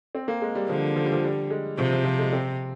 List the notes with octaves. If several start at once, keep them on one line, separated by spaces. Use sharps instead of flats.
C4
A#3
G#3
G3
D3 F3
F3
G3
F3
G3
G#3
C3 F3
F3
F3
G#3
C4